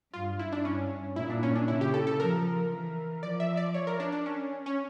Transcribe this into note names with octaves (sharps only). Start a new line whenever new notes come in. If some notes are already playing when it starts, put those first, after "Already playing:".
G2 F4
E4
D4
G2 C#4
A#2 E4
D4
C#4
D4
C#3 E4
G4
A4
A4
F3 A#4
E3
F3 D5
E5
D5
C#5
A#4
D4
D4
C#4
C#4